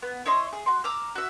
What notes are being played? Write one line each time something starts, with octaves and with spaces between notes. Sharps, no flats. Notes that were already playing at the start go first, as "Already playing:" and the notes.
B3
E4 C#5 D#5 C6
G#4
F#4 C6
A#5 D6 E6 F6
F#4 E5